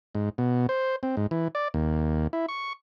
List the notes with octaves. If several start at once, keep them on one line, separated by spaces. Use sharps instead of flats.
G#2
B2
C5
C4
G#2
E3
D5
D#2
E4
C#6